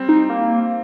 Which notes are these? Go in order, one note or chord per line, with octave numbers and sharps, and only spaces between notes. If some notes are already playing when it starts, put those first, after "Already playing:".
Already playing: G3 C4
D#4
A#3